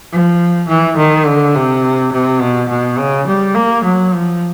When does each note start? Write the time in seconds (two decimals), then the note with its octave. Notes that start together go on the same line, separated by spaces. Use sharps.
0.12 F3
0.68 E3
0.97 D#3
1.26 D3
1.55 C3
2.12 C3
2.41 B2
2.69 B2
2.98 C#3
3.28 G3
3.55 A#3
3.85 F#3
4.13 F3